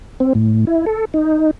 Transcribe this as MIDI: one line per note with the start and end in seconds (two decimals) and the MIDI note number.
0.20 0.33 60
0.35 0.65 45
0.67 0.85 64
0.86 1.05 69
1.14 1.51 63